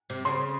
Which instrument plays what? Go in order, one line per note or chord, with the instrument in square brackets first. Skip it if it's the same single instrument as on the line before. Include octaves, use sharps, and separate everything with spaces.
[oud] C3
[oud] C#3 [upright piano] C6